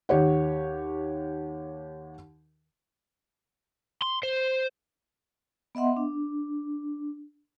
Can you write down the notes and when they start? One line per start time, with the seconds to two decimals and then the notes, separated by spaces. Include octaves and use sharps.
0.09 D#2 G4 C#5 F#5
4.02 C6
4.23 C5
5.75 B3 D#5 E5 F#5 C6
5.97 D4